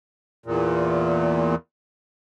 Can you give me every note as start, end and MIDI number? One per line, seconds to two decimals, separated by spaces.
0.46 1.55 40
0.46 1.55 46